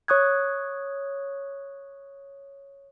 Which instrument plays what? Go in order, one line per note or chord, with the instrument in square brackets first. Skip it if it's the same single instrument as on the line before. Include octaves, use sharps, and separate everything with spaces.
[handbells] C#5 C#6 D#6 F#6 G#6